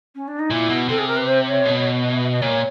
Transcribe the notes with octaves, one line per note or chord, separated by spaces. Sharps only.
C#4
D4
D#4
A#2 E4
B2
C3 A4
G#4
A#4
B4
C5
C#5
B2
D#5
E5
E5
D#5
A#2 C#5